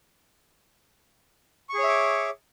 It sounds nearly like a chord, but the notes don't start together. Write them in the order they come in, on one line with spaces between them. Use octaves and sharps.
C#6 G#4 C#5 E5 D6